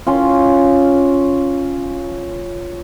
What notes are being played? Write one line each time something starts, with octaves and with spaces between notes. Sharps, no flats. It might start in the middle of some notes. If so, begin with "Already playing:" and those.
C#4 F4